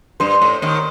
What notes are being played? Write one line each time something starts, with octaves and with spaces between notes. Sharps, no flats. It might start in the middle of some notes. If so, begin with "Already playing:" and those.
G2 C5
A2
D#2 D#3